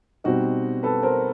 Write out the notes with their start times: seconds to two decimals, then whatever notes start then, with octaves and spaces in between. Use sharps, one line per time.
0.24 B2 G3 C4 D#4 F#4
0.83 A4 B4
1.03 A#4 C5